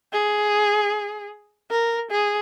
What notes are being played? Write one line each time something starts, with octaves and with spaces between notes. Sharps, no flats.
G#4
A#4
G#4